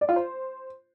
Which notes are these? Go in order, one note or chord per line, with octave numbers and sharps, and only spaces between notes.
D5
F4
C5